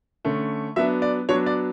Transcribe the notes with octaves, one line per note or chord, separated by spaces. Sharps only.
D3 A3 C#4
F#3 B3 D4 E5
D5
F#3 B3 D4 C#5
D5